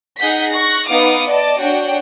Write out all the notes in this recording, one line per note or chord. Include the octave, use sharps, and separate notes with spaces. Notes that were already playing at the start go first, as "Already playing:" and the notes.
D#4 G#4 F#5 G6 B6
C#6 F#6 A#6
B3 D#4 F5 D6 D#6
D5 D#5 A5 D6
D4 F#4 C#5 F#5 G5